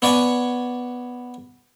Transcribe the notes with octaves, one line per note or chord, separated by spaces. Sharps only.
B3 C#5 D5 F#5 G#5